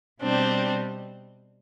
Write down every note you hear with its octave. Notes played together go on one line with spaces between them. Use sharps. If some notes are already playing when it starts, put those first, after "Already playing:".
B2 G3 C4 D4